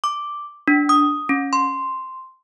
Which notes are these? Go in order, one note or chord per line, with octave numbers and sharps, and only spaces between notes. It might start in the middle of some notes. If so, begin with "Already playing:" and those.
D6
D4
D#6
C#4
C6